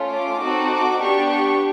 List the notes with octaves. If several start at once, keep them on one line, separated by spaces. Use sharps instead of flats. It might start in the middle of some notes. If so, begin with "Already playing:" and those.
Already playing: A3 C#4 F4
D6
C4 D#4 F#4 A4
D6
B3 D4 G4 C#6
C#6